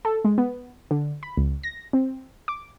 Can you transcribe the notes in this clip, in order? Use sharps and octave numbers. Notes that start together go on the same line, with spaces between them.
A4
G#3
B3
D3
B5
C#2
A#6
C4
D6